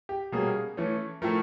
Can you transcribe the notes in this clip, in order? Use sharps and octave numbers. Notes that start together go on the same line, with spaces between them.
G4
B2 G3 A#3 C#4 G#4
E3 A3 C#4
A2 F3 A3 A#4